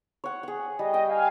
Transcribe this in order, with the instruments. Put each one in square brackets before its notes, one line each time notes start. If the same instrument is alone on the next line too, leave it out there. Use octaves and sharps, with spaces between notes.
[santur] C#5 F#5
G#4 F#5
[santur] G3 [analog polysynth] D#5
[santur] G5
[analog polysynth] F5 G#5